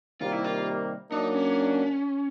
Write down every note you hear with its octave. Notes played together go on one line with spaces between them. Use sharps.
C3 D#3 G3 A#3 F4
E4
F4
F#3 A#3 D4 D#4
C#4